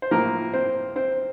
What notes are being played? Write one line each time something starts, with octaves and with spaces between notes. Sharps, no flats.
C5
A2 F3 A#3 A#4
C4 C5
C4 C5